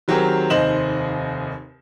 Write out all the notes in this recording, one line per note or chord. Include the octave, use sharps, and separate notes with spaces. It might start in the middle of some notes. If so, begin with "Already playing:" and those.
D#3 F#3 C4 G4 G#4 A#4
F1 D#2 C5 D#5 E7 F#7